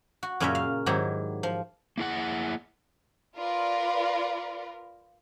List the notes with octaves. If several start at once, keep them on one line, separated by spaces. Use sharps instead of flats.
F#4
F#2 A#2 C#3 C#4 A#4 E5
F5
G#2 D#3 F#3 E4 G4
F3
A#3 E4 G#4 F#5
F4 A#4 B4 D5